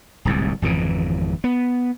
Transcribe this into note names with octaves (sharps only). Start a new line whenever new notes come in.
D1 C2 G#2
G#1 F2 C#3 E3
B3